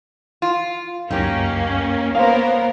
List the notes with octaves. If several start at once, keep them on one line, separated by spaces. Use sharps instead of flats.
F4
C#2 F#2 A#3 C#4 D#4 G4
A#3 B3 A#4 C5 C#5 F5